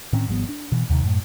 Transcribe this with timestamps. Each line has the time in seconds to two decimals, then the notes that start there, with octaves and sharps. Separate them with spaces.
0.13 A2 D#3 C4 C#4
0.28 G#1 F3 G3 B3
0.49 D4
0.72 B2 E3
0.90 D#2 C3 D#3
1.03 F#2 A2